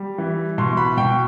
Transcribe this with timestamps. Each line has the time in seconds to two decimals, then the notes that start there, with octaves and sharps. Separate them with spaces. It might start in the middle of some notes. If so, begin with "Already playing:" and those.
Already playing: G3
0.18 E3
0.58 B2 C6
0.77 B5
0.97 B2 G5